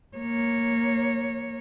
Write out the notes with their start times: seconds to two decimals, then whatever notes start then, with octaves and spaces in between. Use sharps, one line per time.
0.17 A#3 C#5